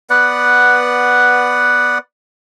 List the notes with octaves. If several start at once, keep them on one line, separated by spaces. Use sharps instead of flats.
B3 B4 D5 F#5